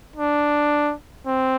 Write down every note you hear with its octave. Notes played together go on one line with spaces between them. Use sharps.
D4
C4